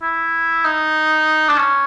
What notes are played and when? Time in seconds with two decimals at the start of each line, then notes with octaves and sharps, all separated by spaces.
0.02 E4
0.65 D#4
1.49 D4
1.58 C#4